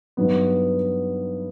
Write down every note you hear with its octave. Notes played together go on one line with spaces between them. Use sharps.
G2 D#3 F#3 B3